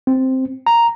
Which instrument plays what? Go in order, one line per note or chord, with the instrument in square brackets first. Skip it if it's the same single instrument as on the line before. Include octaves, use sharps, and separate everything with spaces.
[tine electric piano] C4
A#5